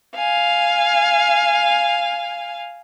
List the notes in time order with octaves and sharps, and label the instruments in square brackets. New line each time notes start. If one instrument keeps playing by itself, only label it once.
[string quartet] F5 G#5